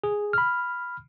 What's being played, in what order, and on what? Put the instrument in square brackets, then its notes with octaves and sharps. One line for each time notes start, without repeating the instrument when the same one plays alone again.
[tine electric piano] G#4
B5 F6